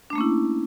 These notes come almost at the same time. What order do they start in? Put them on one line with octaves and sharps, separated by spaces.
D4 A3 A#3 C#4 E4